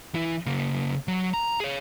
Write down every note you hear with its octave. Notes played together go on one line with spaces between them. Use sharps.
E3 E4
C#3 A#3
F#3
A#5
G#4 C#5